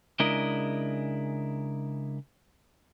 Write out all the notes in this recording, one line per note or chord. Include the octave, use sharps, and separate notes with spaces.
C#3 G#3 D4 E4 A#4 D#5